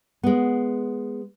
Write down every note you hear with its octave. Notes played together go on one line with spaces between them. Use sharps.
G#3 B3